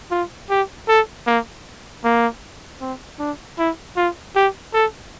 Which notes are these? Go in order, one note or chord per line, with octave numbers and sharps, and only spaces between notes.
F4
G4
A4
A#3
A#3
C4
D4
E4
F4
G4
A4